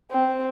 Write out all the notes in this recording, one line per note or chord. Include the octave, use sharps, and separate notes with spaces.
C4